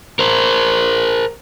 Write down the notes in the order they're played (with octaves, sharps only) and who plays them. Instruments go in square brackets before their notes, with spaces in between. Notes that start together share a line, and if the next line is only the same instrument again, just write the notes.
[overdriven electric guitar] A#4 C5